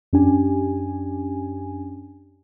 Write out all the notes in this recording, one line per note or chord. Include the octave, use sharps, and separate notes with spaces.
F#2 C#4 D4 G4 G#5